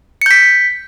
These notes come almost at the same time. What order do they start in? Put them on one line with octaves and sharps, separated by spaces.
C#7 G6 B6